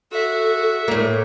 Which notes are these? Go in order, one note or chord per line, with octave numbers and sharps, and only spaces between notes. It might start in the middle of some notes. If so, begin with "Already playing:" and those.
F#4 A4 E5
A2 A#3